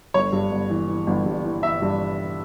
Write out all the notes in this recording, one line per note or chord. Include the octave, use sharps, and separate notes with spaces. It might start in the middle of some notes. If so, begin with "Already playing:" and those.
G1 C#5
G2
G1
E3
E3
G1
G2
E3
E3 E5
G2